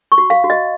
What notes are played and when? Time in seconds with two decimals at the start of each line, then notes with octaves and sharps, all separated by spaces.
0.12 C#6
0.18 F#4
0.30 F5
0.44 F#4
0.50 D#5